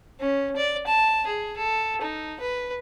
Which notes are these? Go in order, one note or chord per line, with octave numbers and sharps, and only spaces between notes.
C#4
D5
A5
G#4
A4
D#4
B4